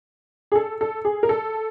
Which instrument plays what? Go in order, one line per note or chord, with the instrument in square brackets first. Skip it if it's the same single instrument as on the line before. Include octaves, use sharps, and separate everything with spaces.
[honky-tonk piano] G#4
A4
A4
G#4
A#4
A4